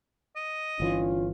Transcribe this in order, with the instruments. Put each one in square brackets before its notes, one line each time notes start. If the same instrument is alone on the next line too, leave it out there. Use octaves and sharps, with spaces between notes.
[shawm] D#5
[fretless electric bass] G1 E3 [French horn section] C#4 D4 F4